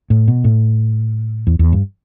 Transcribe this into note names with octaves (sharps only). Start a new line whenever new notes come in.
A2
B2
A2
E2
E2
G2